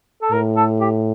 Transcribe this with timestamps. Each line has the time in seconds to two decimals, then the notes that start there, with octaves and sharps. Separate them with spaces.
0.22 A4
0.32 A2 A#4
0.56 A4
0.81 G4